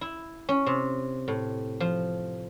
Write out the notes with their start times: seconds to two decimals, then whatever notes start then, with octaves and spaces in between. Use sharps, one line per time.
0.01 E4
0.49 C#4
0.66 C3
1.28 A2
1.80 F3